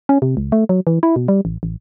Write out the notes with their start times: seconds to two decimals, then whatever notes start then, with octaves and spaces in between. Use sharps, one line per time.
0.09 C#4
0.22 C3
0.37 C#2
0.52 A3
0.69 F#3
0.87 E3
1.03 E4
1.16 B2
1.28 G3
1.45 A1
1.63 A1